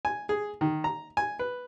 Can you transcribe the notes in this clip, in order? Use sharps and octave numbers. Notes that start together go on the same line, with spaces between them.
G#5
G#4
D#3
A#5
G#5
B4